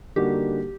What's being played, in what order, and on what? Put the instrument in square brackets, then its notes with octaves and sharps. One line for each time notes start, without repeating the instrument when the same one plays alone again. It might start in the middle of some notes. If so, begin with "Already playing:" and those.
[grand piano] D3 G3 A#3 D#4 F#4 [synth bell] G4